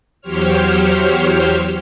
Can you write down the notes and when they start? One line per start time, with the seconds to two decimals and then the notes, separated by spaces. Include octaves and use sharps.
0.21 E2 F#3 G4 C5 C#5 F6